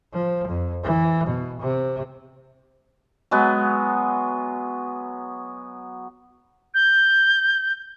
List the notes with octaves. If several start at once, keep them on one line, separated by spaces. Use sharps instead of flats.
F3
F2
E3
B2
C3
F#3 G#3 B3
G6